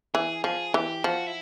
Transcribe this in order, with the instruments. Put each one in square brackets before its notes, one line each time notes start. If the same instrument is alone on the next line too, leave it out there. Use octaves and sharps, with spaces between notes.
[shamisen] E3 [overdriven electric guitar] G#4
[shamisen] F3 [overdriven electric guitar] G#4
[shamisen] E3 [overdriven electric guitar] G4
[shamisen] F3 [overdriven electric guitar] F#4
[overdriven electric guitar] E4